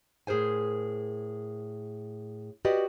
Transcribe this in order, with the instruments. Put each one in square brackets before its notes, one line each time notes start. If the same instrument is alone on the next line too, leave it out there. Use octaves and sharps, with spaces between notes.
[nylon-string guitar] A2 G#4 A#4 C5 G#5
F#4 G4 B4 D5 D#5